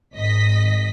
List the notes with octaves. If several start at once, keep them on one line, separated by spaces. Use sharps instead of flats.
G#1 D#5 B6